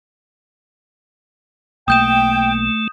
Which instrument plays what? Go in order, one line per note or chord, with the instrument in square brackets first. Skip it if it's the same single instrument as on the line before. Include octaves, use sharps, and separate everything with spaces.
[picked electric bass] B1 A#3 [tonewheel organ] A3 [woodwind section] G5 [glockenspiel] D#6 G6 E7